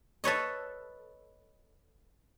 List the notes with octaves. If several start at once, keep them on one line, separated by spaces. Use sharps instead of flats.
A4 B4 C#5 D#5